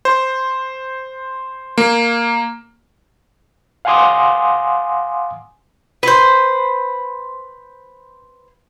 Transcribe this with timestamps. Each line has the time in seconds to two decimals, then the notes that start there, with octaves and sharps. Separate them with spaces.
0.05 C5
1.78 A#3
3.85 F5 F#5 G#5 C6 D6 D#6
6.03 B4 C5